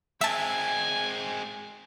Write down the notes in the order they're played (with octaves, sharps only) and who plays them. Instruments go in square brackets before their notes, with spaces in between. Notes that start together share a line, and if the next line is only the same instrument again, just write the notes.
[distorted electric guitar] G#3 C4 [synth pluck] E5 A5 [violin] G#5